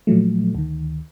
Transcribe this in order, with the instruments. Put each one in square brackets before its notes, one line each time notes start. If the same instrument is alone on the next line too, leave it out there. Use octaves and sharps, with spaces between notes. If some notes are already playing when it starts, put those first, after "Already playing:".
[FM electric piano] A#2 F3 F#3 A3
D2 D#3